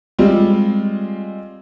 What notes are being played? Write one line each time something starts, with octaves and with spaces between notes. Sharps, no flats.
G3 G#3 C4 F4